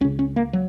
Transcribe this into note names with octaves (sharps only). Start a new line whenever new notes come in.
C#2 C#3 C#4
C#4
A#3
F#3